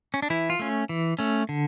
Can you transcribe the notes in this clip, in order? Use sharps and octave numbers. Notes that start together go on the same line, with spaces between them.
C#4
D4
E3 E4
F4
A3 C#4
E3
A3 C#4
D3